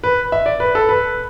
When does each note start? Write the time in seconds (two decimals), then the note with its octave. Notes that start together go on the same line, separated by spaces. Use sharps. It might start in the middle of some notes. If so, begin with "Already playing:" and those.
0.04 B4
0.32 E5
0.46 D5
0.60 B4
0.75 A4
0.89 B4